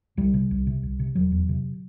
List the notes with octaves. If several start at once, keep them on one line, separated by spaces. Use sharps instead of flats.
C2 G3
C3
C2
C3
C2
C3
E1 F#3
E2
C3